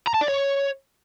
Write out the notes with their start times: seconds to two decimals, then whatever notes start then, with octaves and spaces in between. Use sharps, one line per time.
0.07 A#5
0.14 A5
0.21 D5
0.28 C#5